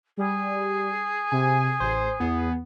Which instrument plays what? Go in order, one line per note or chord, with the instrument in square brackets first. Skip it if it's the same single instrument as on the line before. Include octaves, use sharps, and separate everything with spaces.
[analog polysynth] G3 [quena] G#4
[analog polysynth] C3 [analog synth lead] G#5
[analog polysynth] A1 [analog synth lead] C5
[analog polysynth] E2 [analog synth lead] B3